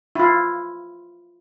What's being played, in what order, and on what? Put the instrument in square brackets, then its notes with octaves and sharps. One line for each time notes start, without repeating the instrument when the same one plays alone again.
[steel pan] E4 F4